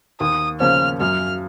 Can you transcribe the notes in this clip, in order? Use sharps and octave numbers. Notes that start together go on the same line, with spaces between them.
D#2 D#6
C#3 F3 A#3 C#4 F6
F#2 F6